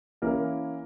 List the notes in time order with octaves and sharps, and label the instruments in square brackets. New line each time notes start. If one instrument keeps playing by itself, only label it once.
[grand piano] E3 A#3 C#4 E4 A#4